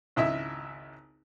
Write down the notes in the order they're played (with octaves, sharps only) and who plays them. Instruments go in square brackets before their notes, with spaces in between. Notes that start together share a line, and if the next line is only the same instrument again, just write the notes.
[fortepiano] G#1 C#2 E4 D#5 E5